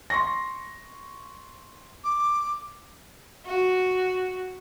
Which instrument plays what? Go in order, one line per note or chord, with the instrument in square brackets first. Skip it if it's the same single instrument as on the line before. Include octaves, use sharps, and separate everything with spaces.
[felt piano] C6 C#6 A#6
[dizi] D6
[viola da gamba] F#4